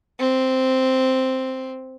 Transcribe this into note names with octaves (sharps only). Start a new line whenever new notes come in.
C4